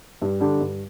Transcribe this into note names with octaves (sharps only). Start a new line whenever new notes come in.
G2
D3 G3 D4
G2